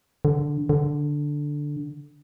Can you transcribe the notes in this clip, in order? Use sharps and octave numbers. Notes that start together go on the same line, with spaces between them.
D3
D3